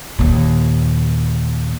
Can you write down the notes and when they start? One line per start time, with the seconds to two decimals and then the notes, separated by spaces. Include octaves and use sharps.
0.19 D#2 A#2